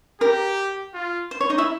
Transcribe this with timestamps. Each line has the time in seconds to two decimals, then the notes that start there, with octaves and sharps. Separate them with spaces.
0.21 G4 A#4
0.94 F4
1.31 C5
1.41 C#5
1.50 D#4 D#5
1.58 E4 E5